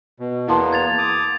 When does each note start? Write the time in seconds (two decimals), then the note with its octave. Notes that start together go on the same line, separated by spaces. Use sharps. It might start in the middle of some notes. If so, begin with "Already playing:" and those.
0.19 B2
0.48 E2 A#3 B3 E4 A5 C6
0.73 G#6 A6 F7
0.98 D6 D#6